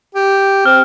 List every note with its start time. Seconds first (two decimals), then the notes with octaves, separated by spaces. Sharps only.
0.15 G4
0.66 C4 F6